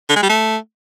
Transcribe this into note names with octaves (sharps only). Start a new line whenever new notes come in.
D3
G#3
G3
A3